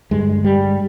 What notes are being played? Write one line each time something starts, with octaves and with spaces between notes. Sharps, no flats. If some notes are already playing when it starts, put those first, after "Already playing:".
G2 D3 G#3
G3